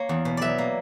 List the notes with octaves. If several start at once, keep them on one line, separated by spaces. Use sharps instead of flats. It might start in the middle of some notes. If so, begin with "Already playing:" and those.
Already playing: A#3 C#5
E2
B2
F#3 D5 E5
A#3